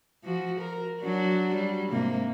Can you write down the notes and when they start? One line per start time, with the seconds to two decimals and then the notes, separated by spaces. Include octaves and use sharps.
0.24 F3 F#4
0.60 A#4
1.01 F#3 D4 F#4
1.55 G3
1.91 G#2 C3 A#3